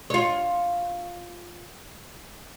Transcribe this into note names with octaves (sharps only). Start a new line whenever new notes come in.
F4 C#5